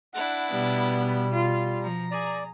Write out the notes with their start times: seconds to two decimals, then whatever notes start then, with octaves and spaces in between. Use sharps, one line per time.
0.14 D4 E4 F#5 B5
0.52 B2 G3 B3
1.33 F4
1.83 F3 A#5
2.11 G#4 D5